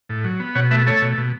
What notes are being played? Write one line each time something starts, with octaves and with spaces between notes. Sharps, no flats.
A2
F#3
B3
B2 C#5 F#5
A3 B4 E5
A3 A4 C#5
B2
B2